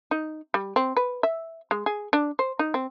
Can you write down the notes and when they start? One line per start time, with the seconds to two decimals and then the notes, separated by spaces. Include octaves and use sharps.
0.11 D#4
0.54 G3
0.76 C4
0.97 B4
1.23 E5
1.71 G#3
1.86 G#4
2.13 D4
2.39 C5
2.59 D#4
2.74 C4